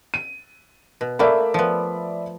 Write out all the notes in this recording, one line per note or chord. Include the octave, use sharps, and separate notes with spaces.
D#7
B2
A3 A#3 D5 E5 B5
F3 B3